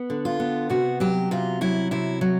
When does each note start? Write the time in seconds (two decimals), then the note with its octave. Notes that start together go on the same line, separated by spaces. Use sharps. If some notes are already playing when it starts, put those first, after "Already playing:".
Already playing: B3
0.10 D3
0.25 F4
0.40 B3
0.70 C3 F#4
1.00 F#3 G4
1.31 C3 F4
1.61 F#3 E4
1.91 C3 E4
2.21 F#3